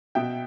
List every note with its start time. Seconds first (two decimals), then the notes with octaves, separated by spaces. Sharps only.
0.15 B2 E5 G5